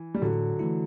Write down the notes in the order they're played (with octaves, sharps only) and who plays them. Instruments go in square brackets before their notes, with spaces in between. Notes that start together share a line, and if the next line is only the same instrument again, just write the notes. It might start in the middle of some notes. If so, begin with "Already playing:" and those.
Already playing: [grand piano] E3
G3
[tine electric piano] A2 [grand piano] D3 F#3
[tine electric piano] E3 A3 E4